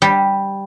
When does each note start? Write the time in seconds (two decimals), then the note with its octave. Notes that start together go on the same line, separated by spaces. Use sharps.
0.02 G3